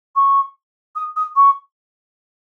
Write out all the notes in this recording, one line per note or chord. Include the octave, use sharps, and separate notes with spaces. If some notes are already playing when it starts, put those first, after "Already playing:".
C#6
D#6
D#6
C#6